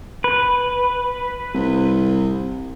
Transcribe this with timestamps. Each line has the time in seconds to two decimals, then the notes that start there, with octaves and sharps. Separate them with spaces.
0.24 B4
1.54 C2